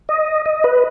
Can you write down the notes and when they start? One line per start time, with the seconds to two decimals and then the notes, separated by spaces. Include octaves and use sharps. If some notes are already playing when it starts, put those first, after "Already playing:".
0.09 D#5
0.46 D#5
0.64 B4